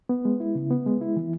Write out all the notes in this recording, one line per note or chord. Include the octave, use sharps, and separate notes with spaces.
B3
G#3
E4
C#3
B3
G#3
E4
E3